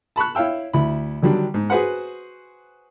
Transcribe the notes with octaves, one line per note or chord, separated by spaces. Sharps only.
A5 B5 C#6 F#6
E4 C#5 F5 G5 E6
D2 E4 B5
D3 D#3 F#3 G3 D4
G#2
F#4 G#4 B4 C5 F#5